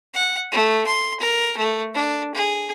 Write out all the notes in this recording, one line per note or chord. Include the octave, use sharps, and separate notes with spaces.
F#5
A3
C6
A#4
A3
D4
G#4